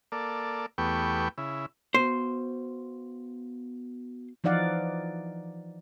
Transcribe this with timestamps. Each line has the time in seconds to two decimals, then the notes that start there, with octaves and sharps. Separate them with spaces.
0.12 A#3 A4 D5
0.78 E2 A3 B3 G4 G5 C#6
1.38 C#3 E4
1.94 B3 F#4 C5
4.44 E3 F3 D#4 D5 F5 F#5